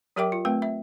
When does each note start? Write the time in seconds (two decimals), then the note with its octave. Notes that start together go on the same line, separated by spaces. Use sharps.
0.16 F#3 G4 A#4 E5 G5 D6
0.32 F4
0.45 A3 C4 B4 G5
0.62 E5